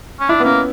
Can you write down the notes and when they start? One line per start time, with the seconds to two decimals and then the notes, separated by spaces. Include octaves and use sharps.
0.20 C#4
0.29 D4 E4
0.40 B3
0.44 A#3 C#4